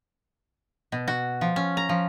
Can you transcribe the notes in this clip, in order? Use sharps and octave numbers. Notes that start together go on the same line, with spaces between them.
B2
F#4
F3
C#4
A#5
F3